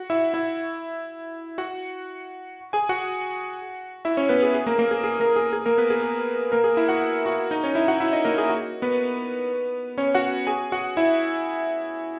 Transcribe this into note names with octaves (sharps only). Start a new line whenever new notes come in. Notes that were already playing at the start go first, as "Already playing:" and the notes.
Already playing: F#4 F#5
E4 E5
E4 E5
F#4 F#5
G#4 G#5
F#4 F#5
E4 E5
C#4 C#5
B3 B4
G#4
G#4
A#3 A#4
A#3 A#4
G#4
G#4
A#3 A#4
G#4
G#4
A#3 A#4
B3 B4
G#4
G#4
A#3 A#4
G#4
E4 E5
F#4 F#5
F#4 F#5
D#4 D#5
C#4 C#5
E4 E5
F#4 F#5
E4 E5
D#4 D#5
A#3 A#4
G#4
F#4
B3 B4
C#4 C#5
F#4 F#5
G#4 G#5
F#4 F#5
E4 E5